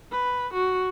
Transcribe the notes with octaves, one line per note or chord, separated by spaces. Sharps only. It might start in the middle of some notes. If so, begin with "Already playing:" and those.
B4
F#4